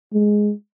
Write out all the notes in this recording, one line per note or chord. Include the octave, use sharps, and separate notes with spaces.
G#3